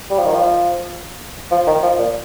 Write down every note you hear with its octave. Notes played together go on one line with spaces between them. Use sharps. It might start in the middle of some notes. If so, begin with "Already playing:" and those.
G3
F3
D#3
F3
F3
D#3
F3
A#2